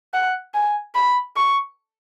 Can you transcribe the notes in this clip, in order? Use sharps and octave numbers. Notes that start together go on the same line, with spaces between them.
F#5
G#5
B5
C#6